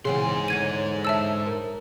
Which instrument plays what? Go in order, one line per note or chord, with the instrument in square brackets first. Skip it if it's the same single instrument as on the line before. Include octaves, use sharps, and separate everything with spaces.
[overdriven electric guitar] G#2 C6 [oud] C#3 E3 C4 [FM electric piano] G#4 F#5
[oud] E2 D3 C#5 [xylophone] G#6 D#7
[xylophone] E5 A5 E6
[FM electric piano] A#4